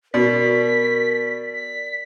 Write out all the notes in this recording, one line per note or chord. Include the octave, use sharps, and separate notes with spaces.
B2 A#4 D5 B6
B6